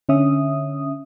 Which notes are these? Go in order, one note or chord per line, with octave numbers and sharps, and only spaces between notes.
D3 C#4 E5 D#6